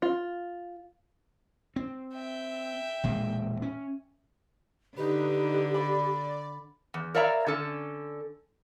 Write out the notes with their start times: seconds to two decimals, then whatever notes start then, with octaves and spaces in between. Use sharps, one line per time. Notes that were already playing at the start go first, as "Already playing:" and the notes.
0.02 F4
1.76 C4
2.14 E5 G5
3.03 E1 A#2 G#3
3.62 C#4
4.97 D3 D#4 G4 B4
5.74 D5 B5
6.94 E2
7.15 A#4 C#5 D5 E5 F5 A#5
7.46 D3 C#4 A4